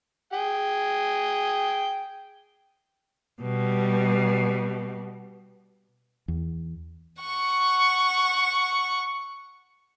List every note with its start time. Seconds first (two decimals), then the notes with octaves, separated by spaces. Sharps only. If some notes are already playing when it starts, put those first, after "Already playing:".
0.33 G#4 G5
3.42 B2 G3
6.28 E2
7.22 F#5 C#6